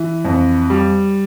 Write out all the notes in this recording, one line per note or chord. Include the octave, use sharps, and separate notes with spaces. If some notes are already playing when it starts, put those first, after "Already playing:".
Already playing: E3
F2
G3